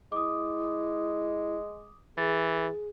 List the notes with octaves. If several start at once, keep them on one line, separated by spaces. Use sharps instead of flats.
G#3 E4 D6 D#6
E3 G#4 A6